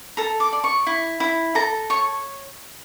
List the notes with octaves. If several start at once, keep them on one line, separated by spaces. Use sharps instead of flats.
A4 A#5
D6
D5
C#6
E4
E4
A4 A#5
C#5 C#6